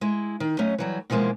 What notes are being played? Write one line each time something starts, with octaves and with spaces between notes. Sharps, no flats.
G#3 E4
D#3
F#3 A3 C#4 D#5
E3 F#3 G3
B2 E3 F3 G#3 A#3